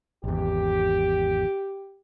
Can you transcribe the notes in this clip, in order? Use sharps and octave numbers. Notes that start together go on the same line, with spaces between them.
G#1 E2 G4